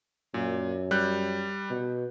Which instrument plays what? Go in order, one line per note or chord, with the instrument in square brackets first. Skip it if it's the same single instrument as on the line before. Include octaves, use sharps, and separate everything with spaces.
[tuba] F#2 [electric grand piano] A#2
[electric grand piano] G3 F#6 G6
[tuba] B2